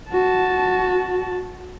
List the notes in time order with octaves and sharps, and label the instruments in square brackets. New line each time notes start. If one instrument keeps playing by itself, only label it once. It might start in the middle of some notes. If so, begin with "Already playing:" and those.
[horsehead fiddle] F#4 A5